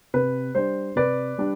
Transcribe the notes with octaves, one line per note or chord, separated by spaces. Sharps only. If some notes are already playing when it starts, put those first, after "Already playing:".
C3 B4
G3 D4 C5
C3 B4 D5
G3 D4